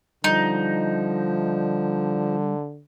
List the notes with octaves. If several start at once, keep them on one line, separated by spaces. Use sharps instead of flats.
D3 F3 G3 D#4